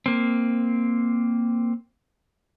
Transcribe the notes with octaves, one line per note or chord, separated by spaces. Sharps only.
A#3 C4